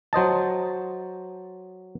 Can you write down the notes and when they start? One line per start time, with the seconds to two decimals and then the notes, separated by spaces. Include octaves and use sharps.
0.13 F#3 C5 D#5 A5